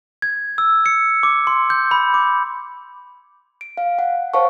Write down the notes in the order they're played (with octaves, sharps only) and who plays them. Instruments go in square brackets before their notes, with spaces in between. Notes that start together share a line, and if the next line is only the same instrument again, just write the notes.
[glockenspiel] G#6
E6
C#7
D6
C6
G6
B5
D6
[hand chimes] D7
F5
F#5
C5 C#5 F5 F#5 A5 C#6